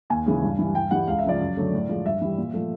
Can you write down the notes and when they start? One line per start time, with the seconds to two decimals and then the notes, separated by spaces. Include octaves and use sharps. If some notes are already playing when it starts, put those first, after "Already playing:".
0.10 D#2 G#5
0.26 C#3 E3 G#3
0.43 G2
0.59 E3 G3
0.74 G2 G5
0.91 E3 G3 F#5
1.07 C#2 F5
1.19 E5
1.24 C#3 F3 D5
1.41 F#2
1.57 D3 F#3 A3
1.73 A2
1.89 F3 G#3
2.05 G2 E5
2.22 E3 G3
2.38 A#2
2.54 F3 A3